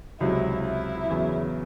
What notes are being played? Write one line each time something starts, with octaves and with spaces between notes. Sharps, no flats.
C#2 C3 F#3 E4
E4
E2 C#3 F#3